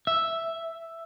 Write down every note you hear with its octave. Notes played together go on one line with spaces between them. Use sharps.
E5